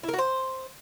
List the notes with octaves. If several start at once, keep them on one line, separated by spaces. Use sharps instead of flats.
E4
A#4
F#4
C5